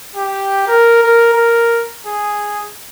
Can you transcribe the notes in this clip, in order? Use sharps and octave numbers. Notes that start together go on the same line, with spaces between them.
G4
A#4
A#4
A#4
G#4